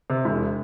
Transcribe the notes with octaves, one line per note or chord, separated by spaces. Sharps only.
C3
E1